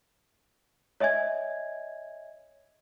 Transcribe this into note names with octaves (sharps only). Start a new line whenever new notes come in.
C#5 D#5 E5 G#5 G#6